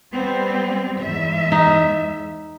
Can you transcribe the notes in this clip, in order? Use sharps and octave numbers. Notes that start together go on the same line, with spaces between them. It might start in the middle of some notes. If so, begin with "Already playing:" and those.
G3 B3 C4
E2 G#2 E5
D#4